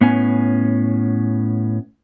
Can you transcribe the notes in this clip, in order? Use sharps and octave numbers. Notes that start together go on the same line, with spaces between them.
A2 B3 C#4 G#5